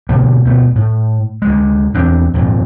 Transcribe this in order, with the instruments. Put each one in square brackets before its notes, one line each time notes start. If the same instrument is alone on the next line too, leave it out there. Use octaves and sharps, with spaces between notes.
[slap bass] B2 D3 G3 A#3
D2 B2 A3
A2
D2 G#3
E2 C4 D4
D#1 F2 G#2